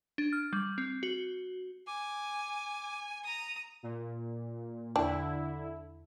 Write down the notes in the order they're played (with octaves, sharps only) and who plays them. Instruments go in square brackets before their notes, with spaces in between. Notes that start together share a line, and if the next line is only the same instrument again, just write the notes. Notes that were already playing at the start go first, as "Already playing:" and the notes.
[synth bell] D4
F6
G3
C4
F#4
[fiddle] G#5 [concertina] D6
[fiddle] A#5 D#6
[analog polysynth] A#2
[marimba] E2 [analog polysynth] D3 E4 [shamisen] D4